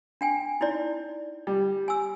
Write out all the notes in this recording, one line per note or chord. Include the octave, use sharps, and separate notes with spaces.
D4 G5 G#5
D#4 E4 D5
G3
G#5 E6